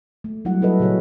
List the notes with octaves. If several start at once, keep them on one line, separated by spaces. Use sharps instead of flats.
A3
F#3 G3 E4 F#5
E4 A4 B4 D#5
A#2 C#3 F#4 G#4 C#5